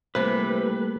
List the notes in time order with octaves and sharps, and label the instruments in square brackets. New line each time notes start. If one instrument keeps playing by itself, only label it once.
[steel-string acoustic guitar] C3 E3 G4 [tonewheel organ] G3 A3 A#3 [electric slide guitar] B4 [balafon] C5